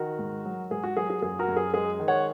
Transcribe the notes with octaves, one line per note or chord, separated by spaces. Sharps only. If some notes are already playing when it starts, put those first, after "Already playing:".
Already playing: D#3 F#4 A#4
G#2
F#3
G#2 G#4
F#4
F#3 G#4
G#4
F#2 G#4
F#4 A#4
F#2
G#4
G#3 G#4
D#3
C#5 F#5